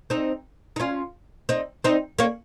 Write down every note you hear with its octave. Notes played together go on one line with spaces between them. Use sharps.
C4 D#4
D#4
C#4 F4
C4 D#4
C4 D#4
A#3 C#4